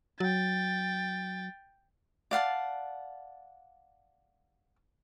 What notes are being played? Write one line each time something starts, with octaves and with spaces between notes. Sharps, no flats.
F#3 G5 A6
D5 F5 F#5 A5